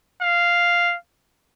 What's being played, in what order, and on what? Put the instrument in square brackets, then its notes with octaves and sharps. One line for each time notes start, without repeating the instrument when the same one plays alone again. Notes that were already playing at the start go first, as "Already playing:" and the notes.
[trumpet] F5